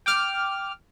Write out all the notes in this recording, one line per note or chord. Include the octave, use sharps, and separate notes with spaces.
G5 D6 F6